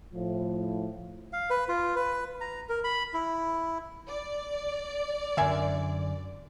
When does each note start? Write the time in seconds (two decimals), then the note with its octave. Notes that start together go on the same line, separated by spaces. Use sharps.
0.13 A2 F3
1.33 F5
1.50 B4
1.68 F4
1.96 B4
2.41 A#5
2.69 A#4
2.84 B5
3.14 E4
4.09 D5
5.37 F#2 D3 A#4 E5 G#5